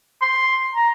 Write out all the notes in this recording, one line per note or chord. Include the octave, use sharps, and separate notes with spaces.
C6
A#5